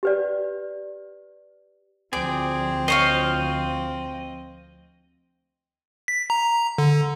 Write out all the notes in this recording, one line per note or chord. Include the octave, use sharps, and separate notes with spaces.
G4 B4 D5
D2 F3 C4 G#4 D5
C5 C#5 D#5 F5
B6
A#5
D3